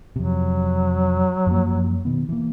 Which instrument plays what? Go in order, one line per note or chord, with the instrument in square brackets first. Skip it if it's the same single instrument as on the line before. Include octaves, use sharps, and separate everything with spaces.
[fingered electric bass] F2 C3 [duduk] F#3
[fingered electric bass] F#2 F3 A#3
B2 D#3 B3
E3 A#3